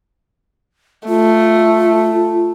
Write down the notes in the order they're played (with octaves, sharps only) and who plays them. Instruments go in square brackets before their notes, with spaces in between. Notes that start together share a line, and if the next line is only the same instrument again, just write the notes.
[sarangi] A3 [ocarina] F4